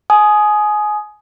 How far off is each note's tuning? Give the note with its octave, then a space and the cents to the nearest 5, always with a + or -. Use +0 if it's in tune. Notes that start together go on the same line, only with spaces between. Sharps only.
G#5 +20 D#6 +0